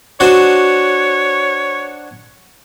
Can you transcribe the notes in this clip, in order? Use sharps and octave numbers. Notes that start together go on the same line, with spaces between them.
D4 F#4 C5 C#5